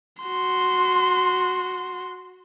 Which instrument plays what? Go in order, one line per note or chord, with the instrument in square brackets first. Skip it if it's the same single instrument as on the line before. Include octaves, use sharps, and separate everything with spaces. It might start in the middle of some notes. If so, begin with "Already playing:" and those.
[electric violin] F#4 C6